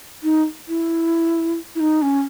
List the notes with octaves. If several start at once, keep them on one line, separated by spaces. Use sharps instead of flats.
D#4
E4
E4
D#4
C#4